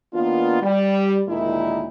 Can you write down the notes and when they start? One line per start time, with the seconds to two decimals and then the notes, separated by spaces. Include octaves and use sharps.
0.14 D#3 A#3 B3 D4 F4
0.61 G3
1.27 D2 A#2 D#3 G#3 D#4 E4